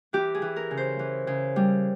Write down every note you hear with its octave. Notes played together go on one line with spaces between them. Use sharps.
E3 G4
G#4
E3
A#4
C#3
C5
E3
C#3
G3